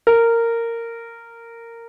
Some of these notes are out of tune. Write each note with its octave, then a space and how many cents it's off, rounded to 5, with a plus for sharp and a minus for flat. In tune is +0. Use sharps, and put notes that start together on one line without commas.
A#4 -15